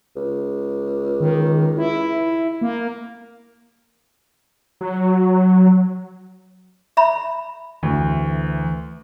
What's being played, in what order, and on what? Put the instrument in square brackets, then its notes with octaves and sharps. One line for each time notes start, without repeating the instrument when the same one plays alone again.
[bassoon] C#2
[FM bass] D#3
E4
A#3
[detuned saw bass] F#3
[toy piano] E5 A#5 B5
[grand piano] D2 [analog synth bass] E3